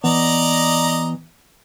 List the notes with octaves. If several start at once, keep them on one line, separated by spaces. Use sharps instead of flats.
E3 B3 D5 D#5 A#5